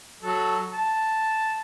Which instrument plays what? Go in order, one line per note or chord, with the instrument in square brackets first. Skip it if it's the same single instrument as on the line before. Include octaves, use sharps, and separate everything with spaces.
[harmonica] F#3 A4
A5